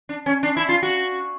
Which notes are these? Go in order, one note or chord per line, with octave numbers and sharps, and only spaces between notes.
D4
C#4
D4
E4
F4
F#4